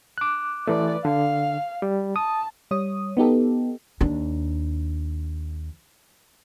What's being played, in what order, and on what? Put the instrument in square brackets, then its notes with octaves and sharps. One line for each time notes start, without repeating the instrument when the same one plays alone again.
[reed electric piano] D6 F#6
[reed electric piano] E3 A3 [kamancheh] B4 D5
[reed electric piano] D3 [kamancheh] F5
[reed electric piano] G3
[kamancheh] A5 [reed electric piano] D#6
[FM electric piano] G3 C#5 D#6
B3 D#4 G4 A4
[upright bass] D#2 D4